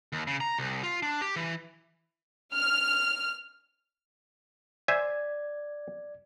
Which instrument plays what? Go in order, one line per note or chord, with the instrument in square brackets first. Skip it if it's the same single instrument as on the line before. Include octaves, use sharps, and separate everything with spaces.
[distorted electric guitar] D#2
C#3
A#5
C2
F4
D4
G4
E3
[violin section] F6
[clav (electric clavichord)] C5 E5 G#5 [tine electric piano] D5 G#6